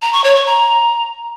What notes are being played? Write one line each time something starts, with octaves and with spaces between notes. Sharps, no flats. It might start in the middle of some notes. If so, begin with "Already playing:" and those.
A#5
C#6
C#5
C#6
A#5